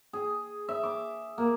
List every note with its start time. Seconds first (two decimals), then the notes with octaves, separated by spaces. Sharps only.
0.13 G#4
0.69 E5
0.83 D6
1.38 A#3